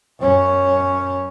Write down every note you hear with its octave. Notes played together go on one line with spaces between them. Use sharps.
F#2 C#4